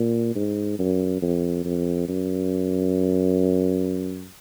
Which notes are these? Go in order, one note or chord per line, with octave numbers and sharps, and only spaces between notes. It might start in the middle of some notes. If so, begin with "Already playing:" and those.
Already playing: A#2
G#2
F#2
F2
F2
F#2